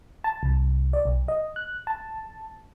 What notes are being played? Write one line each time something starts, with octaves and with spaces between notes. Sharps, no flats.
A5
C2
D5
B1
D#5
F#6
A5